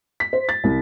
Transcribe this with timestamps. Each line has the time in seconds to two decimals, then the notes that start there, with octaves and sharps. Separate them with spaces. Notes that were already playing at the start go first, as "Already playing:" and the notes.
0.20 B6
0.33 C5
0.49 A6
0.64 C2